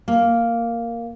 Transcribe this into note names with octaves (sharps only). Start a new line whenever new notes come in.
A#3